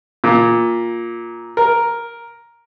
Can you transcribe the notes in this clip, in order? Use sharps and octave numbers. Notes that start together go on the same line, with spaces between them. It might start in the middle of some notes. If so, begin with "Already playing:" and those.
A#2
A#4